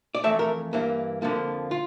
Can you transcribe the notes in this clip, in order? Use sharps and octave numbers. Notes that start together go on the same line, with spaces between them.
D5
F2 E3 A3 E5
A#4
G2 E3 A#3
F2 D3 F3 A#3
F4